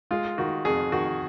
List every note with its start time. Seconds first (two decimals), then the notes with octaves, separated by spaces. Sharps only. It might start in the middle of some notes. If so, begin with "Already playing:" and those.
0.11 G#3 F4
0.38 D#3 F#4
0.65 F2 G#4
0.92 D#3 F#4